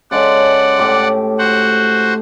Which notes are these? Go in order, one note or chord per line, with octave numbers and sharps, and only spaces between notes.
C#3 G#3 A4 D5 F#5
A2 G4 D6
F#4 C5 F#5